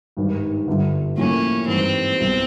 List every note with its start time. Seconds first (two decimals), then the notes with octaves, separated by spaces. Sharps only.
0.17 G#1 G2 D#3
0.67 G1 G2 D3
1.17 A2 F3 A#3 C#4
1.67 G#1 G2 E3 C4
2.18 C2 B2 F#3